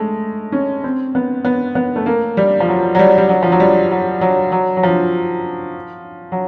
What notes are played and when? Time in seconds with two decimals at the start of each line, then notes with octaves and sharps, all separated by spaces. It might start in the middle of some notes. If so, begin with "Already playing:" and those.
Already playing: G#3 A3
0.52 C#4
0.84 C4
1.15 B3
1.45 B3
1.75 B3
1.96 A3
2.06 A#3
2.37 G3
2.60 F3
2.69 F#3
2.95 F#3
2.99 G3
3.18 G3
3.29 F#3
3.43 F3
3.52 F#3
3.60 G3
3.91 F#3
4.21 F#3
4.52 F#3
4.77 F#3
4.83 F3
6.32 F#3